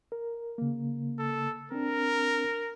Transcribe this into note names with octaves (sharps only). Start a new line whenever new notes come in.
A#4
C#3 A#3
A4
C4 D4 A#4